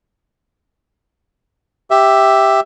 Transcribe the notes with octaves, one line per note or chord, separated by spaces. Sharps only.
G4 E5